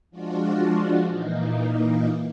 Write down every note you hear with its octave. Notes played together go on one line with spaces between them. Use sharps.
F3 G#3 D4 F4 F#4
A#2 E3 A#3 D#4